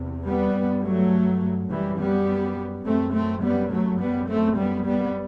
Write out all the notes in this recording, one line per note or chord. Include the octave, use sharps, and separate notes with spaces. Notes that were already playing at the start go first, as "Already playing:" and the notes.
Already playing: E2 C3
G3 B3
G2
F#3 A3
F#2 E3 G3
G3 B3
F#2 A3 C4
A3 C4
G3 B3
F#3 A3
F#2 G3 B3
A3 C4
G3 B3
G3 B3